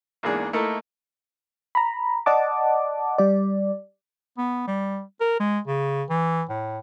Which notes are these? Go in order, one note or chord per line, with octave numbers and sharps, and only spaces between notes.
E2 G#2 A#3 D4 G#4
A3 A#3 D#4 E4 A4 A#4
A#5 B5
D5 D#5 F#5 A5 D6
G3 D5
B3
G3
A#4
G#3
C#3
E3
A2